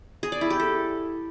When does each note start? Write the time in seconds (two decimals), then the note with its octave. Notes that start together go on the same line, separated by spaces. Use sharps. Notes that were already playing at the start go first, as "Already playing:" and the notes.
0.23 G#4
0.32 D5
0.41 E4
0.50 G4
0.60 A4